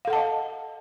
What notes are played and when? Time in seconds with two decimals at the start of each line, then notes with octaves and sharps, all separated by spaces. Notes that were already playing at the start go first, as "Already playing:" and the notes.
0.05 F5
0.07 A4
0.10 F#5
0.13 A5
0.15 D#5